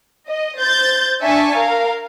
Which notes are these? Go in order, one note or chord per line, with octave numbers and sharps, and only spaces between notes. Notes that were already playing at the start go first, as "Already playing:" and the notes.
D#5
C5 G6 A6
D4 E5 G#5 A5 C#6
A#4 F5